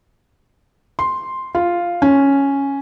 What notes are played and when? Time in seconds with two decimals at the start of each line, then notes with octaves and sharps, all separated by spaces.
0.99 C6
1.55 F4
2.02 C#4